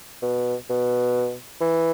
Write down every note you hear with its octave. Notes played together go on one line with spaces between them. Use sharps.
B2
B2
E3